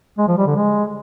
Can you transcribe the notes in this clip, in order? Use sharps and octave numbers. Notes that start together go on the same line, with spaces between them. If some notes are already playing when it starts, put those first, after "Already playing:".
G#3
F3
G3
D3
G#3